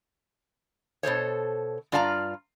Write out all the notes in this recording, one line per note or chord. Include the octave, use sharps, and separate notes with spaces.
B2 A4 C5 C#5
G2 F4 D5 F5 G#5 A#5